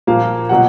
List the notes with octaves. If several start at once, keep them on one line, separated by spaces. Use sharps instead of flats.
A#2 F3 A#3 F5
B2 F#3 F#5